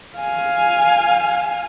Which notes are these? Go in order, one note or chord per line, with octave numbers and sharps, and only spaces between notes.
F5 G#5